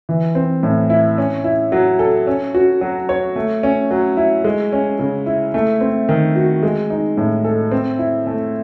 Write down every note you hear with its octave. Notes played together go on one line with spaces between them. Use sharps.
E3
C4
A2
E4
C#4
E4
F#3
A4
C#4
F#4
F#3
C#5
A3
C#4
F#3
E4
G#3
C#4
C#3
E4
A3
C4
D#3
F#4
G#3
D#4
A2
A4
C4
E4
A3